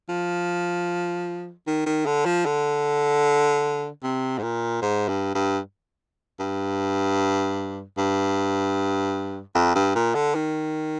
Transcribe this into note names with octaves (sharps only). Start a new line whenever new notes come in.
F3
D#3
D#3
D3
F3
D3
C3
G#2
A#2
G#2
G2
G2
G2
G2
F2
G2
A#2
D3
D#3